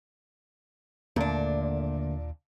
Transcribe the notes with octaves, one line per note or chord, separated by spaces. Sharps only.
D#2 A#2 D3 A3 A#3 D4